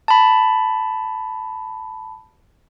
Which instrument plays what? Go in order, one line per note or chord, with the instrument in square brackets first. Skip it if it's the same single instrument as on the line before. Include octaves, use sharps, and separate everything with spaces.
[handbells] A5 B5